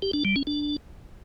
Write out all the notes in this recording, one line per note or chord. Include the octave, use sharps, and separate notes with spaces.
G4
D4
G3
C#4
D4